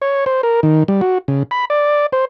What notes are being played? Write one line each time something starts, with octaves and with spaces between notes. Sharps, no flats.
C#5
C5
A#4
D#3
G3
F#4
C#3
B5
D5
C5